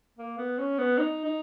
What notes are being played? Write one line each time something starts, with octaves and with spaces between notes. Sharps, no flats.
A#3
B3
C#4
B3
D#4
D#4